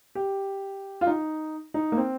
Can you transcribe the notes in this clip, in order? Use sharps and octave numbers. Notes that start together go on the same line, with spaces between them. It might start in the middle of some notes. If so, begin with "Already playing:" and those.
G4
F4
D#4
D#4
A#3
C4